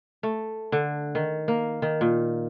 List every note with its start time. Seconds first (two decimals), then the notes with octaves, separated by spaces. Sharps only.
0.23 A3
0.72 D3
1.15 D#3
1.48 A#3
1.82 D#3
2.01 A#2